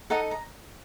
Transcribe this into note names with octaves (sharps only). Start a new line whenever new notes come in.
D#4 A4 D#5 F#5 A#5
A#5